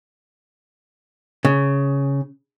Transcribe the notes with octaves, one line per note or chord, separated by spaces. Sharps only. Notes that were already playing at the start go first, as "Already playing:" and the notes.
C#3